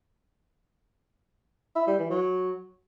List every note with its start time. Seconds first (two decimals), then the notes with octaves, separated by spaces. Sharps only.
1.76 E4
1.87 G3
1.99 E3
2.10 F#3